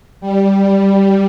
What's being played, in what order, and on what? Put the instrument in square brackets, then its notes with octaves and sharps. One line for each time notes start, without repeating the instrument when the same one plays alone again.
[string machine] G3